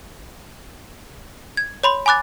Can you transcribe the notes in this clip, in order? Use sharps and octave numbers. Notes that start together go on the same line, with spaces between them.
G#6
C#5 B5 C6
G#5 B5 D6 F#6 A6